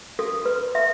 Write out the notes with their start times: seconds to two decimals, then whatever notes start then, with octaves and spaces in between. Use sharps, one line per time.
0.19 A4
0.45 B4
0.75 E5